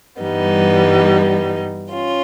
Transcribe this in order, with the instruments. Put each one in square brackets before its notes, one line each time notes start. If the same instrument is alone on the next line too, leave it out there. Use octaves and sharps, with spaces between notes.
[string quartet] G2 E3 G3 B3 D#4
C#4 F4